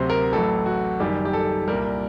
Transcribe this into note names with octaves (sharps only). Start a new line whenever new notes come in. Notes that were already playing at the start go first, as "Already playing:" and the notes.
Already playing: D2 C3 F#3 C5
A#4
A1 A2 F#3 A4
F#4
F#1 F#2 D#3 G3 G4
G4
A4
C2 A#2 G3 A#4